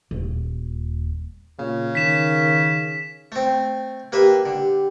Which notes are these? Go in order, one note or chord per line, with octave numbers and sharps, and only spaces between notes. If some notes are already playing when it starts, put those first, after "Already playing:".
D#1
A#2 C#3
D#3 B6 E7
A3 C4
A#3 G4 B4 E5
D3